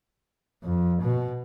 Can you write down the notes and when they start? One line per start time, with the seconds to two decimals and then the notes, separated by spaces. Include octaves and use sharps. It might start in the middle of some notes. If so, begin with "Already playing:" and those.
0.64 F2
1.02 B2